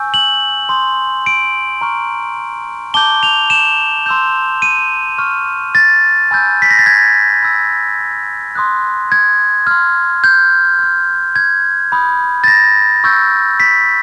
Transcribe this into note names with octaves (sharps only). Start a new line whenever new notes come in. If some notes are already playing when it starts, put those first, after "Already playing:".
Already playing: G#5 C#6 E6 G6
F#7
C6 D#6 G6
D7
A#5 C#6 F6
A5 D6 G6 G7
F7
E7
C6 E6 G6
D#7
C#6 F6
A6
G#5 B5 E6 G6
B6
A#6
A6
G#6
B5 E6 G6
C6 D#6 F#6
G#6
C6 F6
G6
C6 F6
G#6
B5 D#6 G6
A6
A#6
C#6 E6 G6
B6